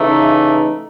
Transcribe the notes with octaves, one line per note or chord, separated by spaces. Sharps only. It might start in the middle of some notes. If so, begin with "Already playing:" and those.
Already playing: C#3 E3 A3 D#4